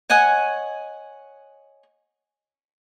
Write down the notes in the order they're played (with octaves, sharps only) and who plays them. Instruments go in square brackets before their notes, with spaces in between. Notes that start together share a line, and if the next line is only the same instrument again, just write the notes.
[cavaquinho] C#5 D#5 F#5 G#5